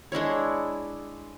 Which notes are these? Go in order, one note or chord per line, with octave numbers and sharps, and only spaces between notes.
G#3 D4 E4 C#5